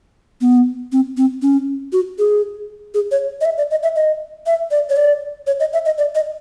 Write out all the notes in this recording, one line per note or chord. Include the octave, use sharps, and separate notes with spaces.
B3
C4
C4
C#4
F#4
G#4
G#4
C#5
D#5
E5
D5
D#5
E5
D#5
E5
D5
C#5
D5
C#5
D#5
E5
D#5
D5
D#5